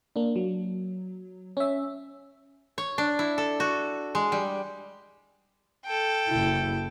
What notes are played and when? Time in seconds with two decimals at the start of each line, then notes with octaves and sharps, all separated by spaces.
0.16 A#3 D4
0.36 F#3
1.57 C#4 E5
2.78 C#5
2.98 D4
3.19 E4
3.38 A4
3.60 F#4
4.15 G#3
4.32 G3
5.86 A4 G5
6.28 F#1 E4